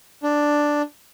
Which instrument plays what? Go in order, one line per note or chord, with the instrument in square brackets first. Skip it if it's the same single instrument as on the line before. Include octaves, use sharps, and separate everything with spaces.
[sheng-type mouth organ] D4